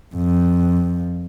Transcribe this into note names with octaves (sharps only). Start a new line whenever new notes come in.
F2